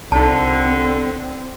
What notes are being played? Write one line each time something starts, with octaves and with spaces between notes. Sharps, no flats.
C2 F2 D3 C4 D#4 A5